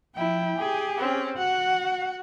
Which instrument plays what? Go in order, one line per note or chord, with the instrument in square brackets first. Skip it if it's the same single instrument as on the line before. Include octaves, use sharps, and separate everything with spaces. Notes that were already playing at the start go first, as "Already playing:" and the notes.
[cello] F3 E4 [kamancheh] G5
[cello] G4 G#4
[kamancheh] C4 C#4
[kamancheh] F#4 [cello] F#5